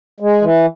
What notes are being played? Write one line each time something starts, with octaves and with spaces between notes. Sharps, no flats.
G#3
E3